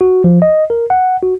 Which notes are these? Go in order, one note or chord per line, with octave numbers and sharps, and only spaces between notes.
F#4
F3
D#5
A#4
F#5
F#4